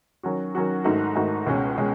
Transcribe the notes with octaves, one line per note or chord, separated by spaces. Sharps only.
D#3 F#3 C#4 F#4
D#3 F#3 C#4 F#4
G#2 D#3 A3 D#4 F#4
G#2 D#3 A3 D#4 F#4
C#2 B2 G#3 C#4
B2 G#3 C#4